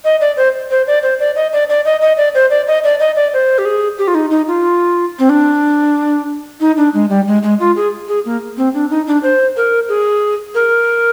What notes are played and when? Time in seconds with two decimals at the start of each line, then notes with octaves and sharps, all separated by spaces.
0.05 D#5
0.21 D5
0.37 C5
0.71 C5
0.87 D5
1.03 C5
1.20 D5
1.36 D#5
1.53 D5
1.69 D5
1.85 D#5
2.01 D#5
2.17 D5
2.35 C5
2.50 D5
2.68 D#5
2.84 D5
3.00 D#5
3.16 D5
3.33 C5
3.58 G4
3.65 G#4
3.98 G4
4.08 F4
4.15 D#4
4.31 D#4
4.48 F4
5.19 C4
5.29 D4
6.60 D#4
6.77 D4
6.94 G#3
7.09 G3
7.27 G#3
7.43 G#3
7.60 F4
7.76 G#4
8.08 G#4
8.25 A#3
8.57 C4
8.74 D4
8.90 D#4
9.07 D4
9.23 C5
9.57 A#4
9.89 G#4
10.55 A#4